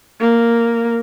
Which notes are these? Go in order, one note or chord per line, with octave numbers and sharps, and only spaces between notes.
A#3